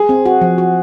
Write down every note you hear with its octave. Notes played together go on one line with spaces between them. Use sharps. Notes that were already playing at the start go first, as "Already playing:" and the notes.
Already playing: G#4
C4
F#4
F3
F#4